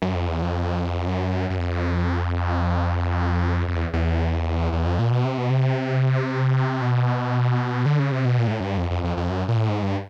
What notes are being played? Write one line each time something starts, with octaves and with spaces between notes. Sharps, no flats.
F#2
F2
E2
F2
F#2
F#2
F2
F2
E2
E2
E2
F2
A#2
B2
C3
B2
C3
B2
D3
C#3
C3
B2
A#2
G#2
A2
F#2
G2
F2
F2
F2
F2
F#2
A#2
A2
G#2
G2